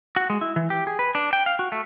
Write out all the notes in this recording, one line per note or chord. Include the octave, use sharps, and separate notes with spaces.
F#4
G#3
E4
E3
G4
G#4
B4
D4
G5
F5
F#4
A3